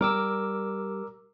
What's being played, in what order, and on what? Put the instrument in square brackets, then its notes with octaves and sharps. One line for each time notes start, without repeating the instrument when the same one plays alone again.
[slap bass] G3 [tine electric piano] A#4 D6 E6